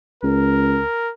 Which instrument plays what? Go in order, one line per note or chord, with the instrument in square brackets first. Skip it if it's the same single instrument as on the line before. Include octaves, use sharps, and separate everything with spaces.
[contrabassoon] C#2 [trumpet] A#4